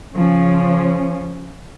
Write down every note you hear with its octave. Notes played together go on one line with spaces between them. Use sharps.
C#3 F3 C#4